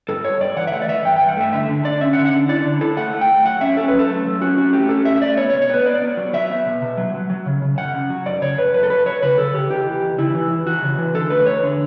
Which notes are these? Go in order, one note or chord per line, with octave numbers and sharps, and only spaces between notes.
G2 A4
G2 C#5
G2 D5
E3 F#5
E5
A3 F#5
D5
E3 E5
G2 G5
G2 G5
F#5
A3 E5
D3 E5
D3
D3 D5
C#4 E5
F#5
D3
F#5
D3
E4 D5
D3
E4 A4
A3 F#5
A3
G5
A3
F#3 F#5
C#4 E5
C#4 A4
B4
F#3
A4
A3
F#3
C#4 F#4
C#4 F#4
A3 G4
C#4 A4
A3 E5
E5
A3 D5
B3 C#5
C#5
B2
C#5
B3 B4
B3 D5
B3
F#3
F#3 E5
B3
B2
B2
F#3
F#3
F#3
C#3
C#3
F#2 F#5
C#3
F#3
F#2 D5
C#3 C#5
F#2 B4
F#2 B4
A4
F#3 B4
F#3 C#5
C#3 B4
C#3 A4
C#3 G4
E2 G4
E3
E2
C#3 E4
E3
E2
E3 F#4
C#3
E3
D3 A4
A3 B4
E2 C#5
D3